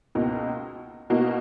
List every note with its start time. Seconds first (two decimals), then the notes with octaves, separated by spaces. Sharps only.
0.15 C#2 B2 A#3 D#4
1.10 B2 A#3 D#4 F#4